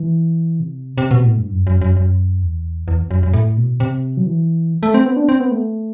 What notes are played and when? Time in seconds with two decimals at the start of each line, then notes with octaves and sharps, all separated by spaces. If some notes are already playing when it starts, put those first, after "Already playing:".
Already playing: E3
0.60 C3
0.98 C3
1.11 B2
1.24 A2
1.38 G2
1.51 F#2
1.67 F#2
1.81 F#2
1.97 F#2
2.42 E2
2.88 E2
3.11 F#2
3.23 F#2
3.33 A2
3.57 B2
3.80 C3
4.17 F#3
4.26 E3
4.83 A3
4.94 C4
5.06 B3
5.17 D4
5.29 C4
5.40 B3
5.52 A3